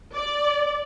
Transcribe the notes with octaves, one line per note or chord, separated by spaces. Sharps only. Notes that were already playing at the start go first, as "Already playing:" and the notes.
D5